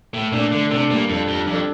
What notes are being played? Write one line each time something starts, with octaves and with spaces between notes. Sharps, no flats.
A2 A3
A#2 D4 A4
D3 A3
C3 D4 A4
A#2 G3
F2 D4 A4
F2 G3
F2 D4 A4